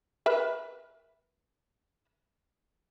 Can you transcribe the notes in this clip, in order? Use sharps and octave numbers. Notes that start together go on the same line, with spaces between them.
A#4 B4 E5